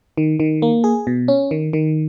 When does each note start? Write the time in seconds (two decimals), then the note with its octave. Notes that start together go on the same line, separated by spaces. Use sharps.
0.17 D#3
0.40 D#3
0.62 A#3
0.84 G#4
1.07 B2
1.28 C#4
1.51 D#3
1.73 D#3